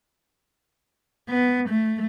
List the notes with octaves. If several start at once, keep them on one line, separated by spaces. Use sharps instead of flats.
B3
A3